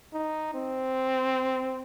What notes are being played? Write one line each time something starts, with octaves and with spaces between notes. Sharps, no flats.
D#4
C4